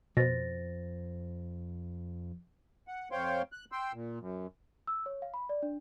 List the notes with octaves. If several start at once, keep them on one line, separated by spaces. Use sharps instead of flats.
F2 B2 C5 A6 A#6
F#5
F2 C5 C#5 F5 G5 C6
F#6
G5 C6 E6
A#2
F#2
E6
C#5
F5
B5
D5
D4